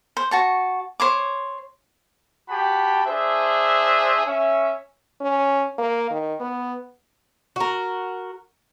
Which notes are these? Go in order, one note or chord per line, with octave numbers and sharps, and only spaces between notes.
C5
F#4 A5 C#6
C5 C#5 D6
F#4 G4 A5 B5
D4 G#4 C5 E5
C#4 E5
C#4
A#3
D#3
B3
F#4 A#4